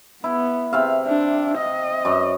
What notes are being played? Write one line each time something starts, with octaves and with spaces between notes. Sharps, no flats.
B3 E4
C3 E5 F5
D4
D#5
F#2